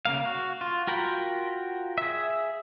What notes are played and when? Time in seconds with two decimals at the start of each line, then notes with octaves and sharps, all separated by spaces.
0.05 C#3 A#3 F5
0.25 F#4
0.61 F4
0.87 F4 F#4 A#4 G5 B5
1.98 G#4 E5